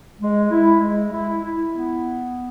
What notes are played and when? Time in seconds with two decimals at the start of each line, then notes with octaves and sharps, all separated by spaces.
0.21 G#3
0.51 E4
0.81 G#3
1.12 E4
1.44 E4
1.74 B3